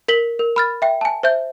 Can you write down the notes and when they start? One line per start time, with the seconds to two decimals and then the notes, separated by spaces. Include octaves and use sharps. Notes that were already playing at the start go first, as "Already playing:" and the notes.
0.08 A#4 B6 F#7 G7
0.39 A#4
0.56 B5 F6 A6
0.82 E5 G5
1.01 G#5 A5
1.23 C5 E5 G6